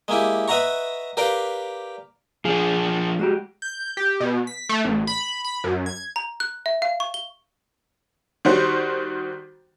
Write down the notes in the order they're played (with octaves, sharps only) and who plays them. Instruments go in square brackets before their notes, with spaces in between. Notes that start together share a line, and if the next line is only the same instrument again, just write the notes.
[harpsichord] G#3 A#3 E4 G4
B4 D#5 E5 F#5 A#5 C#6
G4 A#4 B4 D5 F5 G5
[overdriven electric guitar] F3 D4 [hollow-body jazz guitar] G#4
[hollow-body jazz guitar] G#3 F#4 G4
[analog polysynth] G6
G4
B2
B6
A3
A1
B5
B5
F#2
G#6
[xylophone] A#5
F#6
E5
F5
C#6
G7
[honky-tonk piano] D#3 G3 F#4 C5